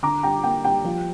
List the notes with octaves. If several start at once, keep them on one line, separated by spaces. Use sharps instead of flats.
D3 A#5 D6
G3 G5 A#5
A#3 G5
G3 G5
F3